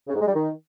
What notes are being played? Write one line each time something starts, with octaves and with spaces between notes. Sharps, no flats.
C#3
G#2
G#3
G3
D#3